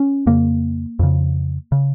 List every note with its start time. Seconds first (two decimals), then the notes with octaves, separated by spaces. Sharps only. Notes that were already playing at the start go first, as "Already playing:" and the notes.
Already playing: C#4
0.26 F2 C#3 A#3
0.99 F2 C#3
1.72 C#3